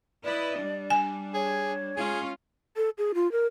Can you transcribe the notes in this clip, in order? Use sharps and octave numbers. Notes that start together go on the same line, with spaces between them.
E4 B4 D5 D#5
G3 D4
G#5
G#4 C#5
G#3 C#4 F4 G#4
A4
G#4
F4
A#4